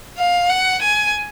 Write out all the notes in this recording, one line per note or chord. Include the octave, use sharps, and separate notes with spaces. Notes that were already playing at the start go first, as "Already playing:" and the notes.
F5
F#5
G#5